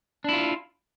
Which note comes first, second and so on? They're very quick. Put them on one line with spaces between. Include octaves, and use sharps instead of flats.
D4 E4 F4